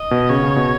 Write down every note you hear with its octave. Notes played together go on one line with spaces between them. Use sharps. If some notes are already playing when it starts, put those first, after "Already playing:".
Already playing: D#5
B2
C#3 C#5
C#3
B2